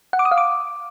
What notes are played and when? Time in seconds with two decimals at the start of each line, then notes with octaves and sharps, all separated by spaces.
0.13 F#5
0.19 D6
0.25 D#6
0.31 F5
0.38 D6